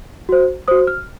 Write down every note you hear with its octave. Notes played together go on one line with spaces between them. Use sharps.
F#4 C5
F#4 C5 D#6
F6